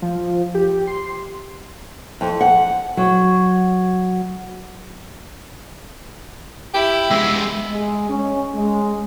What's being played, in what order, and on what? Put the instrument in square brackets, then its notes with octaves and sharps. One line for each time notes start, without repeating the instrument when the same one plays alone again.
[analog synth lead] F3
G4
C6
[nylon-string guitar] F2
F#5
F#3
[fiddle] E4 [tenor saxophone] G4
[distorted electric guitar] G#3 B3 [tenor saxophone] E5
[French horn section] G#3
C#4
G#3